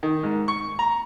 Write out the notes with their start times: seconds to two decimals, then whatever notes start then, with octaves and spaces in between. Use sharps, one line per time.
0.03 D#3
0.23 G#2
0.48 C#6
0.79 A#5